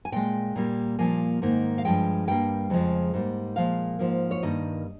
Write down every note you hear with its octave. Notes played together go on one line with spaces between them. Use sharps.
G#5
A#2 G#3 G5
A#2 G3 A#3
A#2 F3 A#3 G#5
G#2 D#3 A#3
F5
G2 F3 G#3 G5
G2 G3 A#3 G5
F2 C#3 F3 G#3
G#2 G3 A#3
A#2 F3 G#3 F5
G#2 F3 A#3
C#5
G2 D#3 G3 A#3 D#5